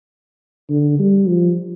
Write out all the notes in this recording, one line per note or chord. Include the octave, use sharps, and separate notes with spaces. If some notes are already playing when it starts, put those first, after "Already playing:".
D3
G3
F3